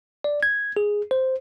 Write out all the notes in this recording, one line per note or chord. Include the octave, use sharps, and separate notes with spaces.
D5
G#6
G#4
C5